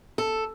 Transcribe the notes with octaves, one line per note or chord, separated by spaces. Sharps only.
A4